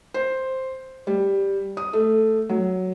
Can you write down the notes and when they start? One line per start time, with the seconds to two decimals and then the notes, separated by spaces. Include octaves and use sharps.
0.14 C5
1.07 G3
1.77 D#6
1.93 A3
2.49 F#3